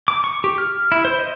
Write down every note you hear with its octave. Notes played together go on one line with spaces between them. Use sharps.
D6
C#6
G4
F6
E4
C5
D#5